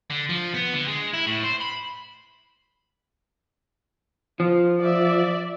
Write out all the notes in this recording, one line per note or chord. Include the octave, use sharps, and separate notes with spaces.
D3
F3
B3
D3
G#3
E4
A2
C5
B5
F3 F4
D5 E5